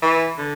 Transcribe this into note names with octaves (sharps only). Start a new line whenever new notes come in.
E3
D3